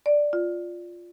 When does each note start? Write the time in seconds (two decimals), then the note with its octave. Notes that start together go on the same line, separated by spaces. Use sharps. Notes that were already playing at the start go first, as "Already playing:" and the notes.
0.06 D5
0.33 F4